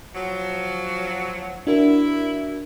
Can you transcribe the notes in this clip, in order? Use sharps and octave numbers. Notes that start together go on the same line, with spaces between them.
F3 F#3
D4 E4 F#4 A#4